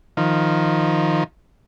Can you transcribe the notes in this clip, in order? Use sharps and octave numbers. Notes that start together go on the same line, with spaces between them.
D#3 F3